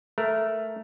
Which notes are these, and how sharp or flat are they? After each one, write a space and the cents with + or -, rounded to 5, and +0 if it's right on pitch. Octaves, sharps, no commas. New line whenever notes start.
A3 +0 A#4 +0